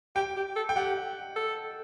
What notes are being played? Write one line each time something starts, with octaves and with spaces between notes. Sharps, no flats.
G4 G5
G4
A4
G5
G4 F#5
A4